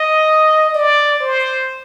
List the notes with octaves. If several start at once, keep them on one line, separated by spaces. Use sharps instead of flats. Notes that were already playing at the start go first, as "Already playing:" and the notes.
Already playing: D#5
D5
C5